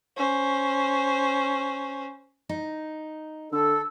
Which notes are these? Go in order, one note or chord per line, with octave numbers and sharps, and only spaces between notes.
C#4 C5
D#4
D3 A4 E6